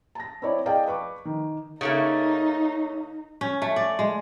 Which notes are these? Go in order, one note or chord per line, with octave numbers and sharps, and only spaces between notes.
A5 A#6
C4 E4 C#5 D5
G#4 D5 D#5 F5 G5 A5
B4 C#6 D6
D#3
C#3 A3 A#3 D#4
C#4
A3
D5
G#3